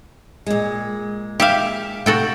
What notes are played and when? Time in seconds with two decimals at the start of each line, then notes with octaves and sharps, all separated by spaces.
0.46 A#2 G#3
1.40 G4 E5 F5
2.06 C3 A3 F#4 A4 G5